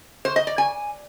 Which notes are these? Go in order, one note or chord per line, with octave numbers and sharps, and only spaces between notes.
C5
D#5
D5
G#5